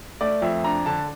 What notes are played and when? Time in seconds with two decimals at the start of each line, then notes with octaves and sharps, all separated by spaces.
0.21 A3 D5
0.42 F2 E5
0.64 D4 A#5
0.86 D3 A5